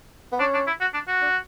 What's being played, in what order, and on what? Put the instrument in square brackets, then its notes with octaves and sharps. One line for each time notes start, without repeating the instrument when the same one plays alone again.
[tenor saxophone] B3
[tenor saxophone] C#4 [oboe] D4
[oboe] D4
E4
F#4
D4
F#4
[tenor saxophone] D4